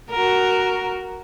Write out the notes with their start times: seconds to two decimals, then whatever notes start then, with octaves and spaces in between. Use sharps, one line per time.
0.10 F#4 A#4